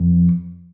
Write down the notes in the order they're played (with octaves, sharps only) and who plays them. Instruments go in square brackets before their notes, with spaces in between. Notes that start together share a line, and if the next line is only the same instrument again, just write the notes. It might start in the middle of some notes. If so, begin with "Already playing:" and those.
Already playing: [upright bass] F2